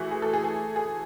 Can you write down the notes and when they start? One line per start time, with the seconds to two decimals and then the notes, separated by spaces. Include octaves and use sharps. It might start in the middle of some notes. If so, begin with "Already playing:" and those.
Already playing: E3 A3 F#4 G#4
0.11 G#4
0.22 A4
0.33 G#4
0.44 G#4
0.76 G#4